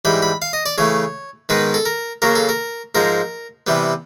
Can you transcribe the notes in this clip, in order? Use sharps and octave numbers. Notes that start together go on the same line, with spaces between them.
G#2 E3 G3 B5
B5
F5
D#5
D5
C#3 E3 A3 C#5
G#2 D#3 G#3 B3 B4
A4
A#4
C#3 F#3 A#3 A#4
A4
A#4
G#2 F3 G#3 A#4
C3 E3 G3 B3